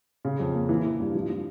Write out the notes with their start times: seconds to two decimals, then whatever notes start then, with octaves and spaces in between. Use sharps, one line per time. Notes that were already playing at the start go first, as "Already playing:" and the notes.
0.25 C#3
0.40 F2
0.54 A#3
0.69 E3
0.85 E3
1.00 G2
1.15 F3
1.30 F3